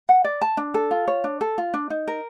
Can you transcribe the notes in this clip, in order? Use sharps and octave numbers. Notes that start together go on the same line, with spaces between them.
F#5
D5
A5
D4
A4
F4
C#5
D4
A4
F4
D4
D#4
A#4